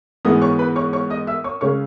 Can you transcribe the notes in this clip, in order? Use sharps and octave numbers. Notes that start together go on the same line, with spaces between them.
G#2 E3 G#3 B3 D#5 D#6
C#5 C#6
B4 B5
C#5 C#6
C#5 C#6
D#5 D#6
E5 E6
C#5 C#6
C#3 G#3 C#4 C#5 C#6